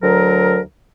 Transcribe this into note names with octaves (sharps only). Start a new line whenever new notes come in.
D2 F#3 A#4